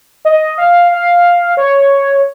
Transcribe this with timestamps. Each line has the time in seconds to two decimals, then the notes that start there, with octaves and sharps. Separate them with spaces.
0.25 D#5
0.58 F5
0.92 F5
1.57 C#5